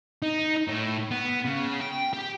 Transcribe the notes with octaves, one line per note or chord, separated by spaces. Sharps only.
D#4
A2
B3
C#3
G5
G4